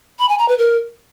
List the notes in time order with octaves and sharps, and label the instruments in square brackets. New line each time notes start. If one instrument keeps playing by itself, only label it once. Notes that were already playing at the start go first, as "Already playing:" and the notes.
[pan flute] B5
G#5
A#5
B4
A#4